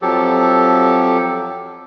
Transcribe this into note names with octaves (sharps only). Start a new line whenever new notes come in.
F2 F3 F#3 G4 A4